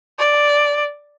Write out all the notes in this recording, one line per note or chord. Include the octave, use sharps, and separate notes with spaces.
D5